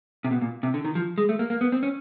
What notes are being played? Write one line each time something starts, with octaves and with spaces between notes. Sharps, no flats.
C3
B2
A#2
C3
D3
D#3
F3
G#3
A3
A#3
A#3
B3
C4
C#4